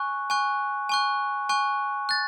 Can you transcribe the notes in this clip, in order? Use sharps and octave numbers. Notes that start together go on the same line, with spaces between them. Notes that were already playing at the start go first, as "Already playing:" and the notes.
Already playing: G#5 C#6 F#6
G#5 C#6 F#6
G#5 C#6 F#6
G#5 C#6 F#6
F#6 A6